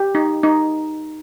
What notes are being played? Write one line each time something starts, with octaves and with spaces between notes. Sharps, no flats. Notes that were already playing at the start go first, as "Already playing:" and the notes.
Already playing: G4
D#4
D#4